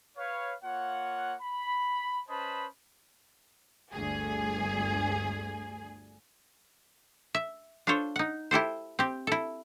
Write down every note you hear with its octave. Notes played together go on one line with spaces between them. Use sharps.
B4 C#5 F5
A#3 F4 C#5 F#5
B5
C#4 B4 C5 D#5 A5 B5
G1 D2 G#4 G#5
E5
D4 F4 A4 C5 C#5
D#4 F#5
E4 G4 A4 C5
C4 G4
E4 A4